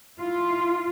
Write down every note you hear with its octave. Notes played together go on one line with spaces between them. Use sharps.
E4 F4